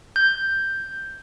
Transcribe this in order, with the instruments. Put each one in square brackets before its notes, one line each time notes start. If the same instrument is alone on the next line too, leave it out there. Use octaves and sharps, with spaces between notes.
[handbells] G6